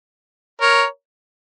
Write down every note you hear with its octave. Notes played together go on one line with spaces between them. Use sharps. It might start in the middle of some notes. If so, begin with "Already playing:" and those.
A#4 C#5